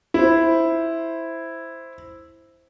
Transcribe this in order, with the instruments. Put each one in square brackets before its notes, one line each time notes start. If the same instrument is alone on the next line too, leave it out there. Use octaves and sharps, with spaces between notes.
[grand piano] E4 C5